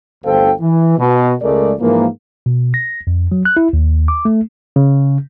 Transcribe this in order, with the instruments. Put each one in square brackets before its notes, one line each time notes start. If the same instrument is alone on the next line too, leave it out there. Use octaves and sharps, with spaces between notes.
[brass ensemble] G1 D2 A4 C5 F5 G5
E3
B2
C#2 G#3 A3 A#4 D5
G#2 E3 F3 A#3
[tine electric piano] B2
A#6
F2
F#3
F#6
E4
D#2
D6
A3
[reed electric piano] C#3